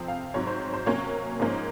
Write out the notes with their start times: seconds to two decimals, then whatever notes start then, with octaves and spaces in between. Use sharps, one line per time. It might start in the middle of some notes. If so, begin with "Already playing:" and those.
Already playing: F2 C3 F3 C4
0.08 F5
0.34 G#2 F#3 C4 C#5
0.47 C5
0.74 C5
0.86 C3 F#3 A#3 C#4 C#5
1.40 G#2 F3 A#3 C#4